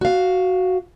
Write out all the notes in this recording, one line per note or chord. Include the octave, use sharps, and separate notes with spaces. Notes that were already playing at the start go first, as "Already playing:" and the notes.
F#4 F5